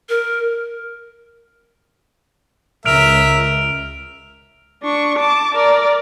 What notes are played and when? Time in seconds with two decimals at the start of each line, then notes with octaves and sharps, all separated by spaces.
0.09 A#4
2.85 C#2 A#4 E5 F6 D7 F7
4.83 D4 C#6
5.18 A5 D6
5.55 A#4 D5